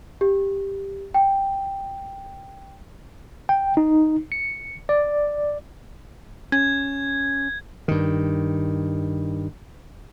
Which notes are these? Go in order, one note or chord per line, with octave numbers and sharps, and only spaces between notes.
G4
G5
G5
D#4
C#7
D5
C#4 G#6
G2 D#3